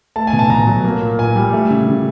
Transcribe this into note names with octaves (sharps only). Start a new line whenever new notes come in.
A3 A5
G#5
B2
A5
B2 A#5
F#3
A#3
A#2
A#2 G#5
G3
A3
C#3
C#3